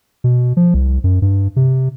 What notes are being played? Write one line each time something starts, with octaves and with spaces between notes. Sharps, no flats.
B2
F3
C2
F#2
G2
C3